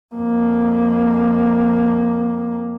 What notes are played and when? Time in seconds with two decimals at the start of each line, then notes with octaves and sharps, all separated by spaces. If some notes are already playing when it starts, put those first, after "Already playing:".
0.15 F2 A#3